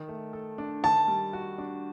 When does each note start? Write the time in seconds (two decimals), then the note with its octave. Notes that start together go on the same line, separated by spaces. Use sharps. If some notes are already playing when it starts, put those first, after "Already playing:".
Already playing: D#3
0.08 A3
0.33 A4
0.58 D4
0.83 D#3 A5
1.08 G3
1.33 F#4
1.58 D4